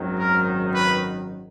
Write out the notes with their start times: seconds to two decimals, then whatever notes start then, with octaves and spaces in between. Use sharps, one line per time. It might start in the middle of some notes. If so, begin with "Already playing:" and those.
Already playing: G#1 F#2 D#3 F#3
0.19 A#4
0.75 B4